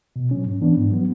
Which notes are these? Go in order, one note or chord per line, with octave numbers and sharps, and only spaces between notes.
B2
F#3 C#4
G#2
E3 B3 D4
G#2
F#3 B3